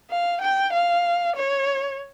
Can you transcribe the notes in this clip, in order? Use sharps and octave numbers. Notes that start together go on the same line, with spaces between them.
F5
G5
F5
C#5